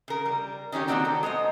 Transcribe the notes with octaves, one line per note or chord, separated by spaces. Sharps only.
C#3 A#4
G3
D#3 C#4 D#4 G4
D#3 F#3 A#3 C4 F#4 D5
A4
G#3 B3 C5 D#5